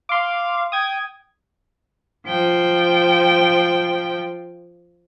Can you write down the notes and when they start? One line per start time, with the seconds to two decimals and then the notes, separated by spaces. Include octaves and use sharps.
0.09 F5 C6 D6
0.72 G5 D#6 G#6
2.26 F3 G5